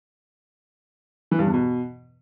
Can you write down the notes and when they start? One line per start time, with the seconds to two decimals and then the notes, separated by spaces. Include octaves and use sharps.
1.31 E3
1.39 G2
1.46 E2
1.54 B2